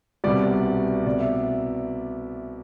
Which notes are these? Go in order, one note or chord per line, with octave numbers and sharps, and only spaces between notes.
C2 B2 G3 D5
C2 B2 A3 D5
E5